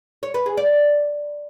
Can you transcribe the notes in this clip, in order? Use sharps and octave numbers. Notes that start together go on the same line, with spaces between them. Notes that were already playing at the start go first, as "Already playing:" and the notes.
C#5
B4
G#4
D5